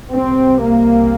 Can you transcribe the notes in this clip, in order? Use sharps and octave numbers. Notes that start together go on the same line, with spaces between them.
C2 C3 C4
A#3